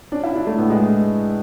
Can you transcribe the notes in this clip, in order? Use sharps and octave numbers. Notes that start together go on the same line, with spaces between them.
C#4 D4
E4
D4 E4
A3
A2 B3
G#3